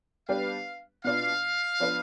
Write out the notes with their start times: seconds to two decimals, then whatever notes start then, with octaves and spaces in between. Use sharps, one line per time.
0.29 G3 B3 D4 G4 B4 F5
1.04 B2 B3 D4 F4 F5
1.80 F3 B3 D4 F4 B4